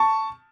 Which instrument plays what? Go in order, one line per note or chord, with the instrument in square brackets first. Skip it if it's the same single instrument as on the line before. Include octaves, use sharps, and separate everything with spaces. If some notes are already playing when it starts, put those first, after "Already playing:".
Already playing: [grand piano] A5 C#6